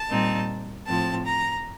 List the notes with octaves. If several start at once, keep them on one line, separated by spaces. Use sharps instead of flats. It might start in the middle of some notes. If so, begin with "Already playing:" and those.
Already playing: A5
A#2 G3 C4 D#4
A2 F3 C4 A5
A#5